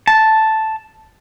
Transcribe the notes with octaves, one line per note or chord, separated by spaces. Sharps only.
A5